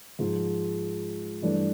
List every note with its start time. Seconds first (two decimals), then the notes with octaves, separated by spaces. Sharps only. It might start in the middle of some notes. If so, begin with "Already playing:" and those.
0.19 G#2 F3 G#3
1.42 G2 E3 A3 D4